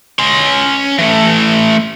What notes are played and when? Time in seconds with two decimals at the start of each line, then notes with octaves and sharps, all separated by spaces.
0.19 C#4 C6
0.98 E3 A3